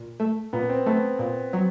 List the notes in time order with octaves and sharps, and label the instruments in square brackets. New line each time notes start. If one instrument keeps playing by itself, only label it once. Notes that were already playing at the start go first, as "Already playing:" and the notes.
Already playing: [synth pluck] A#2
A3
[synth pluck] A#2 [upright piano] B3
[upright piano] C4
[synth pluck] A3 [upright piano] B3
[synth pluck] A#2
F#3